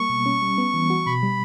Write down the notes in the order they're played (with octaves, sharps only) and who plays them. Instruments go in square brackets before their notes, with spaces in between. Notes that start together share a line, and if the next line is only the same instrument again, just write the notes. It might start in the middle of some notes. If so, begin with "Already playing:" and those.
Already playing: [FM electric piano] G3 A#3 [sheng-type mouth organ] C#6
[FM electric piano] B2
C#4
G3
B3
E3
F#4
[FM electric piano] B2 [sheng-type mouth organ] B5
[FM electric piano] G3